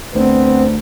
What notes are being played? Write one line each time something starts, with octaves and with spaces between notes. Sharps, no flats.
D2 B3 C4